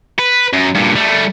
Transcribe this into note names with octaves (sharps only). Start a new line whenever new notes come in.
B4
F#2
G2 A#2
G3 A3